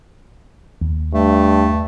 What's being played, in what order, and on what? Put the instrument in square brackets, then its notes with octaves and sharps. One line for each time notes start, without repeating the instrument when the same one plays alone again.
[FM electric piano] D#2
[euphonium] G2 [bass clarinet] A3